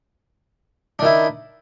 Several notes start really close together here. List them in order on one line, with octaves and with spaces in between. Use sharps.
D4 D#3 E4